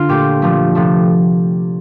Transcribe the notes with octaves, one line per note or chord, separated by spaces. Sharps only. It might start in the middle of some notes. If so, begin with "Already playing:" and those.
Already playing: D3 F4
A#2 A3 G4
A#2 F3 A3
C3 F3 A3